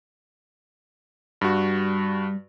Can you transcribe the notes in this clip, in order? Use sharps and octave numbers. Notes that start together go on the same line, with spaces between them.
G2 G3 F#4